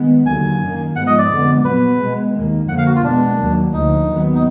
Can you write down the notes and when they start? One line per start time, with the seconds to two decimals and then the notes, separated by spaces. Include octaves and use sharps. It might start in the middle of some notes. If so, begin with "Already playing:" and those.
Already playing: D#3 G#3 B3
0.26 D#2 D3 F#3 A#3 G#5
0.61 F#2 D#3 A#3
0.96 G#2 F3 G#3 B3 F#5
1.07 D#5
1.18 D5
1.30 F2 D3 G#3 B3
1.65 A#2 F#3 B3 B4
2.00 B2 G#3 B3
2.35 D#2 D#3 A#3
2.69 F2 D3 F3 A#3 F#5
2.78 F5
2.86 F#4
2.96 F4
3.04 B2 G#3 B3 D4
3.38 D#2 D#3 F#3 A#3
3.73 D2 D3 F3 D#4
4.09 D#2 D#3 F#3 B3
4.34 D#4